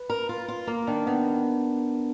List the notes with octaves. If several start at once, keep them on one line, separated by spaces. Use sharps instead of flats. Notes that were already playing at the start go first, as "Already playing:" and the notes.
Already playing: B4
A#4
F4
F4
A#3 A#4
D#3 D4
D#3 B3